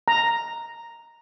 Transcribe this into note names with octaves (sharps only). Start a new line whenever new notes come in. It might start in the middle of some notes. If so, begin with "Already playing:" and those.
A#5